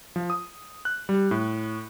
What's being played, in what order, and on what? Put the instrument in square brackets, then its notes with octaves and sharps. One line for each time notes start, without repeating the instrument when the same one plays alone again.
[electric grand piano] F3
D#6
F#6
G3
A2